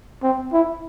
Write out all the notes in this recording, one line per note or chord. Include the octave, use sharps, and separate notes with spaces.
C4
E4